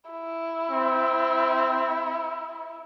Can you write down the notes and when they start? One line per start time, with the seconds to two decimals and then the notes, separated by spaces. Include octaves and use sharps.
0.11 E4
0.71 C4